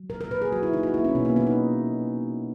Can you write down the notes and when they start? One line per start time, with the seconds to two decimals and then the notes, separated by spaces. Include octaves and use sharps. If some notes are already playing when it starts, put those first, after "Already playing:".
Already playing: F#3
0.09 A#2 A#4
0.21 A#4
0.30 A#2 B4
0.42 G#4
0.52 F#3 F#4
0.63 E4
0.73 A#3 D#4
0.83 F#4
0.94 A#3 E4
1.04 C#4
1.15 B2 B3
1.25 A#3
1.36 B2 B3
1.47 D#4